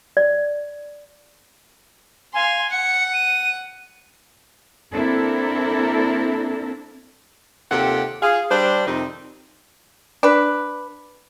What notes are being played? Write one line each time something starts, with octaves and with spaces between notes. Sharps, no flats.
D5
F5 G#5 C6
F#5 C#7
D#7
A#3 C4 D4 E4 A4 A#4
D#2 C3 F4 G4 A4 F#5
F4 G#4 F5
G3 D4 C5
F2 C3 D#3 C4 D#4
D4 B4